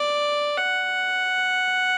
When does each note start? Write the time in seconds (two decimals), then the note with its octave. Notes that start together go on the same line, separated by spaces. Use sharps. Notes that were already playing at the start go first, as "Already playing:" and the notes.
Already playing: D5
0.58 F#5